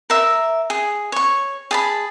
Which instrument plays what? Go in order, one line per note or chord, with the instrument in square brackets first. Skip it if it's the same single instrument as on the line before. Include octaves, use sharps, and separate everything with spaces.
[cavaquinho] A#4 E5
G#4
C#5 C#6
G#4 A5 B5